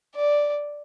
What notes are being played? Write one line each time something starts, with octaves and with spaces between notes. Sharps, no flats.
D5